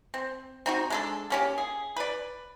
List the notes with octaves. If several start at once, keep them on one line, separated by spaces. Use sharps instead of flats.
C4
C4 D#4 F#4
G#3 D4 A4
A#3 C#4 G4
G#4
B4 D5